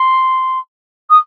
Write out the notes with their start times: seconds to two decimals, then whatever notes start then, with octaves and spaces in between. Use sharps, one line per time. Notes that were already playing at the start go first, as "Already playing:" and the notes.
Already playing: C6
1.10 D#6